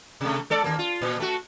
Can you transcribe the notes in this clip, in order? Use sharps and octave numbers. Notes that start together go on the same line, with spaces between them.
C3 A3
G#3 A4 D5
D#2 B2 A#3
F4
A#2
A3 F#4